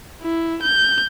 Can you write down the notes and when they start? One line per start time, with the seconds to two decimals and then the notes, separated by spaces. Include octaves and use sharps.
0.22 E4
0.62 G6